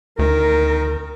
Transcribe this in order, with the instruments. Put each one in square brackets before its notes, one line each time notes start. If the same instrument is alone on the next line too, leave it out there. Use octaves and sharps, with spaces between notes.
[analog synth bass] D2 [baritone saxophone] D#3 [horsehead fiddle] A#4